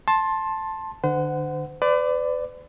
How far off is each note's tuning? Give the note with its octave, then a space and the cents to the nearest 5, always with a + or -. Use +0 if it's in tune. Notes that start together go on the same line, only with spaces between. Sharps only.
A5 +0 C6 +20
D3 +30 C5 -35 F#5 +0
B4 +40 D5 +0